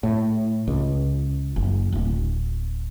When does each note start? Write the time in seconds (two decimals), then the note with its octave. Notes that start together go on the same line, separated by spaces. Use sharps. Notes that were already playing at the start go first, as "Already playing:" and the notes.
0.03 A2
0.67 C#2
1.56 F#1
1.92 D1